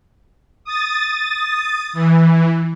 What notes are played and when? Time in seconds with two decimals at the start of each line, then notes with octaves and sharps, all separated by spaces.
0.64 D#6 A6
1.93 E3